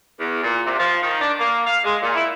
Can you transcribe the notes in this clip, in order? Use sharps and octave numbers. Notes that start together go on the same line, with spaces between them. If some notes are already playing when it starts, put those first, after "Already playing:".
E2
A#2
C3
F3
D#3
D4
A#3
F5
G#3
A#2
E4